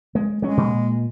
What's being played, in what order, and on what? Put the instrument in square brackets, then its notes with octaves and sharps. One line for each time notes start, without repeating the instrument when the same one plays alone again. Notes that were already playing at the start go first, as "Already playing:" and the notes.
[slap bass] G#3
[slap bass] F#3 C#4 [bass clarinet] G#3
[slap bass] A#2